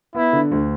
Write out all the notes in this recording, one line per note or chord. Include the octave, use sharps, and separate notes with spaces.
B3 E4
D3
D2